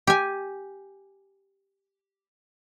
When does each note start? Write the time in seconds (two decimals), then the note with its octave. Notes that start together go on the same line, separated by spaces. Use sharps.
0.07 G4 G#5